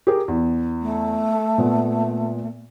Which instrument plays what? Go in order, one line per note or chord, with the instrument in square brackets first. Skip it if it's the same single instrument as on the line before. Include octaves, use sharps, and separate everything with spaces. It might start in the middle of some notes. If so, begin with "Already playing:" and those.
[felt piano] G4 G#4 A#4
E2
[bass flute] A3
[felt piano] A#2 B3